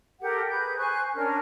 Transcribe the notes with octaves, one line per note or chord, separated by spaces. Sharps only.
G4 A4 A#4 F#5
G#4 B4 G6
C5 G#5 C#6 F#6
C#4 D4 A#4 F6